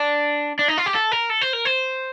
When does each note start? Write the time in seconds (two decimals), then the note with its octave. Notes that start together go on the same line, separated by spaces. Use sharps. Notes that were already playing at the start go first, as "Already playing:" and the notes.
Already playing: D4
0.59 D4
0.68 D#4
0.78 F4
0.86 G4
0.95 A4
1.12 A#4
1.30 A4
1.41 C5
1.53 A#4
1.65 C5